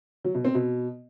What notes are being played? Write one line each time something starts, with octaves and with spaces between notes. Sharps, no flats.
F#3
B2
C4
B2